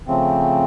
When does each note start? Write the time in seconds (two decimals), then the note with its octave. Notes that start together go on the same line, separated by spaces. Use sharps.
0.08 C#3 F3 A3 C4